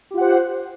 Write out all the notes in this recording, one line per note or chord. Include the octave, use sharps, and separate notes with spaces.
F4 G4 C5 F#5